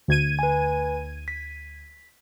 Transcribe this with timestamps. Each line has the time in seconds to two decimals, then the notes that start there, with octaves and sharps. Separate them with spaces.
0.08 D2 G#6 D#7
0.39 B4 G#5
1.28 B6